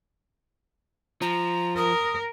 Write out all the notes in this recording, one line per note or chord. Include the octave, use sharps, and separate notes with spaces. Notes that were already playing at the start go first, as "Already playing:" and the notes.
F3 A#5
A#4 D#6